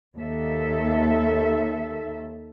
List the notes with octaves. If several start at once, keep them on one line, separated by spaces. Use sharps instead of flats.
D#2 D#3 A4 E5